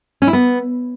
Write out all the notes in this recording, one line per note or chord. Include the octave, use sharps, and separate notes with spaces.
C#4
E4
B3